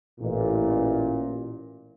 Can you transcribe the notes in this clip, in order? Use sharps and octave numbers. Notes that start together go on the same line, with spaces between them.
A1 A#2